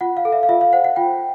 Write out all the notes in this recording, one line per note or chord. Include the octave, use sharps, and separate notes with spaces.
F4 F#5
F5
A4
E5
F5
F4 E5
F5
C5 F#5
F#5
F4 G5